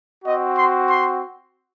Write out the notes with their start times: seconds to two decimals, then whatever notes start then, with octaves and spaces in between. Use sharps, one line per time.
0.24 C4 F#4 D#5
0.56 C6
0.88 C6